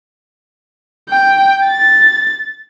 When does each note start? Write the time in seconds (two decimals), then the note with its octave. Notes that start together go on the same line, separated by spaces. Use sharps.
1.10 G5
1.66 A6